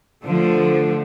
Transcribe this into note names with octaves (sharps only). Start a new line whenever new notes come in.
D3 F3 A3